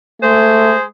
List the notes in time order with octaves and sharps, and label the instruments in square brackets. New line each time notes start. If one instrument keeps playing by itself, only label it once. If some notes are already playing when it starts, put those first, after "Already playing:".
[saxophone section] G#3 G#4 C5 [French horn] A3